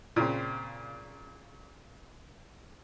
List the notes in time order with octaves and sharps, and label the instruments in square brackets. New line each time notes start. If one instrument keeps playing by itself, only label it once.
[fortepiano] A#2 C#3 C4